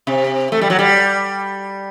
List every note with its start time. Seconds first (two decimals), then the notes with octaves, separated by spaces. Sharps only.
0.07 C3
0.52 A3
0.61 G3
0.70 F#3
0.79 G3